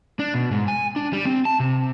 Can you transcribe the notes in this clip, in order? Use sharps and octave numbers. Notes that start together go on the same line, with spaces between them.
D4
B2
G#2
G#5
D4
G3
C4
A5
C3